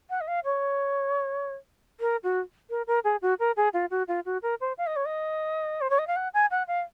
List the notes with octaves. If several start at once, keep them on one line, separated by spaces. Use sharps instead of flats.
F#5
D#5
F5
C#5
A#4
F#4
A#4
A#4
G#4
F#4
A#4
G#4
F4
F#4
F4
F#4
A#4
C5
F5
D#5
C#5
D#5
C5
C#5
D#5
F5
F#5
G#5
F#5
F5